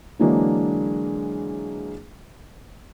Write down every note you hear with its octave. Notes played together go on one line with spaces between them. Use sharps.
D3 E3 F#3 G#3 A#3 D4